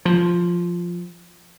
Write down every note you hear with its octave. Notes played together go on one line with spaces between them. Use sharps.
F3